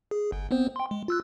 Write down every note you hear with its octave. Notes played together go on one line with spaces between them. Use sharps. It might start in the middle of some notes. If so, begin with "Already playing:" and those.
G#4
G1
B3 C4 C5
G5 C6
G#3
F4 E6 F#6